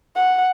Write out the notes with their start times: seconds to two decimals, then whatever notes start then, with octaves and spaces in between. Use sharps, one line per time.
0.16 F#5